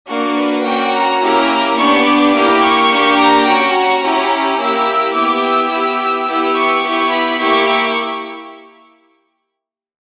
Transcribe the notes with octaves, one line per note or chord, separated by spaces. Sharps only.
A#3 D4 F#4
B4
A#3 C#4 F#4 G5
A#5
A#3 C#4 E4 G4
B3 D4 G4 C#6
D6
A#3 E4 G4
C#6
A#3 D4 G4
A#5
C#4 F#4 G5
A#5
C#4 E4 G4
A#3 E4 G4 E6
B3 E4 G4 D6
E6
B3 E4 G4
B3 E4 G4
C#6
B3 E4 G4
B5
A#3 E4 G4 C#6